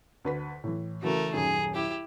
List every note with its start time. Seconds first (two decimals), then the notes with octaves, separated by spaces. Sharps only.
0.25 D2 B4 B6
0.64 A2 E3
1.02 C#3 E3 A3 F#4 A#4
1.33 D#1 F#2 D#4 G#4
1.75 E4 G4